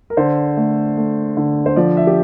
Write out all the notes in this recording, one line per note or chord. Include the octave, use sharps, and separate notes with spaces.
A#4
D3 C5
A3
A3
D3
C5
F3 D5
E5
G4